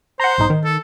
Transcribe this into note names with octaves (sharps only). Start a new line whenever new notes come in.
C5 F#5 A#5
B1 G#2 D#4
D#3
A4